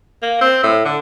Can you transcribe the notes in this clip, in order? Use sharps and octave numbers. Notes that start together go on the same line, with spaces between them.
A#3
C4
A2
D3